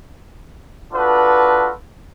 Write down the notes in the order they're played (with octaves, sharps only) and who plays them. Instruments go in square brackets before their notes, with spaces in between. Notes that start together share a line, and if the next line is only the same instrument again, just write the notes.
[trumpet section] D4 F4 F#4 A4 B4